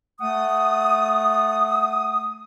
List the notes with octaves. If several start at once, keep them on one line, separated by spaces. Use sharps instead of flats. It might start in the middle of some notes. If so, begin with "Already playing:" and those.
A3 F#5 D#6